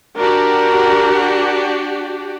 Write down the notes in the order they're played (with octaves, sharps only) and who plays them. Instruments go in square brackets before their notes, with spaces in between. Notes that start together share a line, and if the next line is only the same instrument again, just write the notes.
[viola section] D4 F#4 G4 [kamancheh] A#4